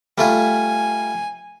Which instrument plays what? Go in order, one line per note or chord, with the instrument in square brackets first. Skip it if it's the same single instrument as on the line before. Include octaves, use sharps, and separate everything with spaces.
[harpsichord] G3 A3 F4 [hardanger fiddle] G#5